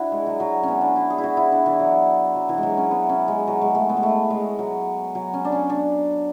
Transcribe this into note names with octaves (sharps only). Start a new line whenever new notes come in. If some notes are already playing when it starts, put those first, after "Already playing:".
Already playing: D4 E4 F#4
G#3
F#3
F#3
B3 C#4
D4
E4
G#4
E4
F#4
E4
D4
E3
F#3
F#3
E3
G#3
F#3
C#4
B3
C#4
G#3
F#3
G#3
A3
B3
G#3
A3
G#3
F#3
F#3
C#4
D4
C#4
D4